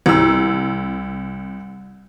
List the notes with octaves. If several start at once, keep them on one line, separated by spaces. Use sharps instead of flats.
C2 E6